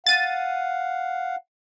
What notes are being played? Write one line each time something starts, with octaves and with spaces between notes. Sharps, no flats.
F5 F#5 A6 D#7